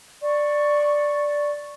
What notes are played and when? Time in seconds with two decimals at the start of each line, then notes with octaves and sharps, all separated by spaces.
0.23 D5 C#6